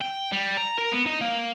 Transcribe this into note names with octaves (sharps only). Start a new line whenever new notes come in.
G5
G3
A#5
A#4
B3
D#4
A#3